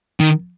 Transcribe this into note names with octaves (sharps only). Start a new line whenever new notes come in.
D#3